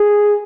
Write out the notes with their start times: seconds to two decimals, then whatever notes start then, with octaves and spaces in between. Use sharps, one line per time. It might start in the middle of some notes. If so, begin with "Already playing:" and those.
Already playing: G#4